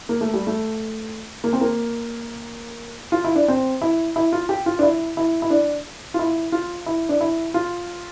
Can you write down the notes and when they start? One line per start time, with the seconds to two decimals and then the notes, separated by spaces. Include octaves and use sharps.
0.09 A#3
0.21 A3
0.34 G3
0.47 A3
1.44 A#3
1.53 C4
1.61 A#3
3.12 F4
3.24 E4
3.36 D4
3.48 C4
3.81 E4
4.16 E4
4.33 F4
4.49 G4
4.66 F4
4.79 D4
4.83 E4
5.17 E4
5.42 E4
5.51 D4
6.14 F4
6.19 E4
6.52 F4
6.86 E4
7.09 D4
7.21 E4
7.54 F4